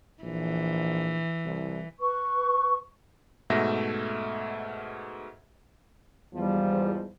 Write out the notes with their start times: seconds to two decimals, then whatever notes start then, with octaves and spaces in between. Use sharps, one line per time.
0.23 A#1 E3
1.45 C2
2.00 B4 C#6
3.50 G#2 B2 A3 E5 A#6
6.34 E2 G#2 F3 G3